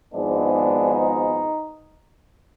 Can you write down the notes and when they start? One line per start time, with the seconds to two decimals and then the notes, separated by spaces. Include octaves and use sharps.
0.13 G#1 G#2 F3 G#3 B3 D4
0.54 D4
0.95 D#4